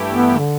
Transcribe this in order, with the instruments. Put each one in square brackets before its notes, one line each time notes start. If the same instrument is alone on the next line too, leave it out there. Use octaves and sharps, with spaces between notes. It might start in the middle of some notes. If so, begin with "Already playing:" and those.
Already playing: [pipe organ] G2 E3 A3 E4 G4
[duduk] B3
D3